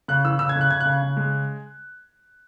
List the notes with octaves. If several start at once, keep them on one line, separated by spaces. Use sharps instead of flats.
C#3 F#6
E3 E6
C#3 E6
G#6
C#3
F#6
C#3 G#6
F#6
C#3
C#3
G#3